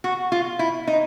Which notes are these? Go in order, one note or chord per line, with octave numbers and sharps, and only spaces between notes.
F#4
F4
E4
D#4